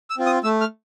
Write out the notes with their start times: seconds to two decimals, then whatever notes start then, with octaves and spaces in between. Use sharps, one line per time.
0.10 E6
0.18 C4 F4
0.26 D#6
0.44 A3 E6
0.61 F6